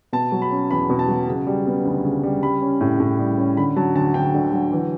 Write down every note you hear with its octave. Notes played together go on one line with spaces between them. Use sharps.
B2 A5
F#3
B5
C#4
E2 B5
B2
A5
F#3
C#3
G3
B3
D2
C#3
G3
G3 B5
C#4
A2
A2
G3
C#4
D3 B5
F#3 A5
D2 A5
D2 G5
D3
F#3
E3